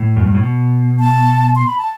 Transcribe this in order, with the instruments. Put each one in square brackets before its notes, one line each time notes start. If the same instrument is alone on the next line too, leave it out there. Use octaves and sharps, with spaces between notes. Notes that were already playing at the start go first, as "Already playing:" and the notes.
Already playing: [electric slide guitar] A2
F#2
G2
A2
B2
[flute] A5
C6
B5
A5